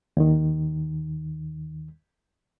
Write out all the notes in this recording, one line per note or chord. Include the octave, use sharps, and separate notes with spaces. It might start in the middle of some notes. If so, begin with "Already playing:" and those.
D#2 D#3